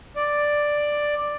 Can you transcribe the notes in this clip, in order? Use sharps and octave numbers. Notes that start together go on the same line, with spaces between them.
D5